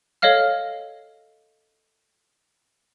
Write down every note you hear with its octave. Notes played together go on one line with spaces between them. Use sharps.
A4 C#5 D#5 F5 F6